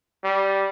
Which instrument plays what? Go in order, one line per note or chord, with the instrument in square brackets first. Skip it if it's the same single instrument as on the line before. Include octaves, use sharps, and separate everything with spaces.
[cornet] G3